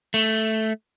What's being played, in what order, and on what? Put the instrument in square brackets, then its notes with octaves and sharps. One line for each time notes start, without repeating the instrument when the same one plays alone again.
[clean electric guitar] A3